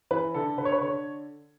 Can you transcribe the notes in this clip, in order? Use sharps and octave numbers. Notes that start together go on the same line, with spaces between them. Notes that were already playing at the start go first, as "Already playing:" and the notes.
E3 B4
D3 A4
D3 B4
C#5
B4
D3 C#5